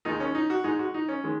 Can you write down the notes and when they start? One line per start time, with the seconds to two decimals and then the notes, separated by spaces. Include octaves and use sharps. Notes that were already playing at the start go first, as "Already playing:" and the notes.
0.05 D#2 D#3 G#3 D#4
0.20 C#4
0.35 D#4
0.50 F#4
0.64 G#2 G#3 D#4
0.79 F#4
0.94 D#4
1.08 C#4
1.24 D#3 G#3